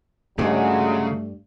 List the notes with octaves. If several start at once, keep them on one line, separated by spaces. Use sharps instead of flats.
G2 C#3 F#3 G#3 A3